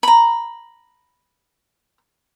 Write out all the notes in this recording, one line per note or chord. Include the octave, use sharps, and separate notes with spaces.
A#5 B5